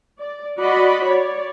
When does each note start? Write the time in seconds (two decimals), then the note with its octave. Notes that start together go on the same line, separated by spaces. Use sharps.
0.21 D5
0.61 F#4 D5 D#5 B5
1.07 C#5 D5